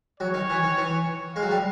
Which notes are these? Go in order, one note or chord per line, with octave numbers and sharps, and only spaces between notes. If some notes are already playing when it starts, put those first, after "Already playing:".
F#3 C#5
D#3
E3
D#3
E3
G#3 F5
F#3
G3